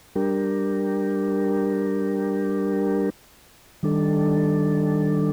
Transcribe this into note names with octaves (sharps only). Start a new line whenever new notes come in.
G3 D4 G4 A#4
D#3 G3 D4 A4